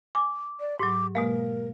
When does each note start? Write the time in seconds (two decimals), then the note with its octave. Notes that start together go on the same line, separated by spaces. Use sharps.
0.15 G#5 D6
0.60 D5
0.79 G#2 F#3 G4 D6
1.15 B2 G#3 A#3 A#4 F5